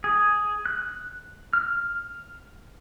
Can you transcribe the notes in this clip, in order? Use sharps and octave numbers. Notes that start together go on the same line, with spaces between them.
G#4
F#6
F6